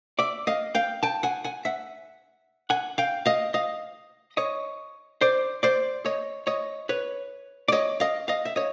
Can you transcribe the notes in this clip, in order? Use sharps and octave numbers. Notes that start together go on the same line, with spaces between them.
D5 E5
D#5 F5
F5 G5
G5 A5
F#5 G#5
F#5 G#5
E5 F#5
F#5 G#5
F5 G5
D#5 F5
D#5 F5
C#5 D#5
C5 D5
C5 D5
C#5 D#5
C#5 D#5
B4 C#5
D5
C#5 D#5
D#5 F5
D#5 F5
E5
C#5 D#5